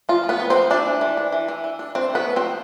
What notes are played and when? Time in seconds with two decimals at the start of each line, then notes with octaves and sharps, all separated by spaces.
0.09 F3 F4
0.24 F3
0.29 B3 B4
0.40 C4
0.50 C4 C5
0.56 F3
0.70 E3 D4 D5
0.86 E3
1.01 E3
1.17 D4
1.32 E3
1.48 E3
1.64 E3
1.79 D4
1.95 C4 D4 C5
2.10 A3
2.15 B3 B4
2.26 A3
2.36 F3 C4 C5